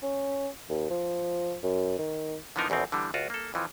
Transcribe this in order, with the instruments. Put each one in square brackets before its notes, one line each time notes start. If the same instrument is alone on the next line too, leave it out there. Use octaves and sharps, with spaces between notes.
[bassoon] C#4
D#2
F3
F#2
D#3
[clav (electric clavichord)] D3 E3 F3 B3 D#4 A#4
A#1 E2 B2 C4
D3 E3 G3
C#2 F4 F#4
A#3 A4
F2 E3 F3